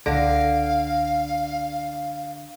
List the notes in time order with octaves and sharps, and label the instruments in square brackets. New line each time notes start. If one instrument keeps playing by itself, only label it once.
[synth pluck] C#2 A#6 D7 [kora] D3 [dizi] F5